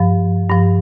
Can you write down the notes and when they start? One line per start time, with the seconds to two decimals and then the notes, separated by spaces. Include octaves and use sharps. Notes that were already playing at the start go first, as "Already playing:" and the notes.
Already playing: G2 F3
0.49 G2 F3